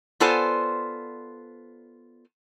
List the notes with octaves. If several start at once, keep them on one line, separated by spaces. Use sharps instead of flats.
B3 F4 A4 C5 D5 G#5